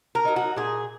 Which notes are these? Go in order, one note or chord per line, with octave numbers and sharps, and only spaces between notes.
A#4
F#3 B3 D#4
F#4
A#2 G#4